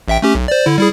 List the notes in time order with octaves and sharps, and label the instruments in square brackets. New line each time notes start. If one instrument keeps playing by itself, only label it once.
[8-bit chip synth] A1 E5 G5
A3 C#4 G4
B1
C5 D5
D3 E4
G3 E4 G#4